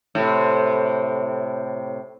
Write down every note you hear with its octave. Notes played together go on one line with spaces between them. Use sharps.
A2 C3